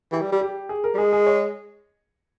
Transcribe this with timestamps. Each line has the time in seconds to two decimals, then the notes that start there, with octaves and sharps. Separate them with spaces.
0.12 E3 G4
0.21 G3
0.32 G3
0.41 G4
0.69 G#4
0.84 A#4
0.94 G3
0.98 G#3 G#4
1.13 G#4
1.27 C#5